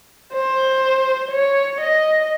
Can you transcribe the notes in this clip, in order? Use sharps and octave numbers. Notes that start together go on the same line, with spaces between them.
C5
C#5
D#5